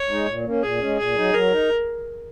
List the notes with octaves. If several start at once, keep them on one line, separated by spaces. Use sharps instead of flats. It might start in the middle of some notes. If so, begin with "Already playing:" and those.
Already playing: C#5
G#3 D#4
A#2
A#3 C#4
A#2 G#4
G#3 C#4
A#2 G#4
F#3 D#4
F#3 A#4
D#4